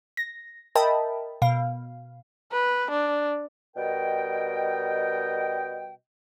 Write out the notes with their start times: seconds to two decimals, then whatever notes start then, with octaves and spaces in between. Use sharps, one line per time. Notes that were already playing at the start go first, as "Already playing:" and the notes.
0.17 A#6
0.75 A#4 D#5 E5 G5 A5 B5
1.42 B2 F5
2.52 B4
2.90 D4
3.76 B2 G3 A#4 D#5 G5